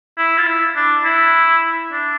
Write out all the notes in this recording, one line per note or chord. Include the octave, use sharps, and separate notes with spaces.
E4
F4
E4
D4
E4
D4